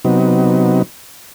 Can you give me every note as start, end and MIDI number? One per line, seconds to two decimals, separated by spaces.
0.05 0.82 48
0.05 0.82 54
0.05 0.82 59
0.05 0.82 63